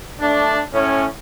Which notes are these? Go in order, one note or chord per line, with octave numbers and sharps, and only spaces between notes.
A3 D4
A2 C#4